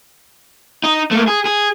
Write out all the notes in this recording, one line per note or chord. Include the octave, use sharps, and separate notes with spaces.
D#4
A3 A#3
G#4
G#4